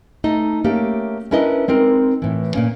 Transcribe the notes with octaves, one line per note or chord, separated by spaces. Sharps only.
A3 D#4 D#5 A5
A3 A#3 C#4 G4
C#4 D4 E4 A#4 B4 D#5
G#3 C4 D#4 A#4
A2 E3
A#2 A#3 C#4